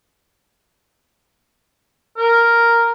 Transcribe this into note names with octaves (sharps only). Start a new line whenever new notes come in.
A#4